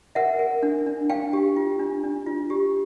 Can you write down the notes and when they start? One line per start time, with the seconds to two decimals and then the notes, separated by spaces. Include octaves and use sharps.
0.15 A#4 E5 F#5
0.39 A#4
0.63 D4
0.86 D4
1.10 D4 F5 G5
1.33 G4
1.56 F4
1.80 D4
2.03 D4
2.26 F4
2.50 G4